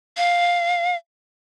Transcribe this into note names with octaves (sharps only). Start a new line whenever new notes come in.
F5